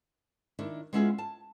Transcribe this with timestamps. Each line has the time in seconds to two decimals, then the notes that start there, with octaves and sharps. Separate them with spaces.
0.59 D#3 D4 E4
0.93 G#3 B3 C#4 E4 F4 G#4
1.18 A5